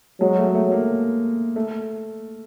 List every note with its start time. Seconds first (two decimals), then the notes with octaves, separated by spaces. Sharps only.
0.21 F#3 G#3
0.39 A3
0.55 A3
0.72 A#3
1.56 A3